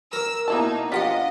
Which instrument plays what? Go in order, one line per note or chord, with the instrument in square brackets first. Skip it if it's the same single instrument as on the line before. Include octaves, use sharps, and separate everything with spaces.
[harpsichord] A#4 [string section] E6
[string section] B2 D#4 [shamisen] A#3 E4 A5
[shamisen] F3 D4 G4 [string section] D#5 [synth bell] F5 F#5 B6